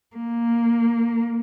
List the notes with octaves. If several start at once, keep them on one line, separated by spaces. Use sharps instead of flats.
A#3